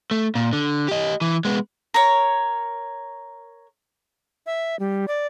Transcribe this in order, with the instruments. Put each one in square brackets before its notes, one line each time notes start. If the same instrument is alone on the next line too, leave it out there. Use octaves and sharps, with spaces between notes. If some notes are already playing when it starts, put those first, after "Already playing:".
[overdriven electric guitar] A3
A#2
D3
G4 D#5
E3
G#3 B3
[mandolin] A#4 C#5
[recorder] E5
G3
D5